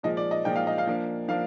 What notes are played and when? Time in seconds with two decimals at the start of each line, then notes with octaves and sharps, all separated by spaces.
0.03 A#2 F3 G#3 D#5
0.17 D5
0.31 D#5
0.44 A#2 F3 G#3 G5
0.56 F5
0.67 D#5
0.78 F5
0.87 F3 A#3 D4
1.28 F3 A#3 D4 F5